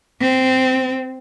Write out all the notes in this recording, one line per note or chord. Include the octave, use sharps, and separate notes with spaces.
C4